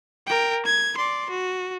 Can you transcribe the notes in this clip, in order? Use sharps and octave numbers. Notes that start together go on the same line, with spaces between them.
A#4 G5
G#6
D5 C6
F#4